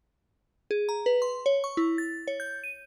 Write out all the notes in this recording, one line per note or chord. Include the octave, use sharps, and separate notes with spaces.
G#4
A#5
B4
C6
C#5
C#6
E4
A6
C#5
G6
D#7